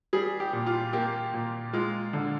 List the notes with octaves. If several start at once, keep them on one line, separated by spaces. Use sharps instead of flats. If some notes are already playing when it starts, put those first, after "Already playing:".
G3 G#4
G4
A#2
F4
A#3 G4
A#2
G#3 F4
D3